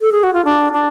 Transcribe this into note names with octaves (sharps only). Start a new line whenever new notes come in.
A4
G#4
F#4
F4
D4
D4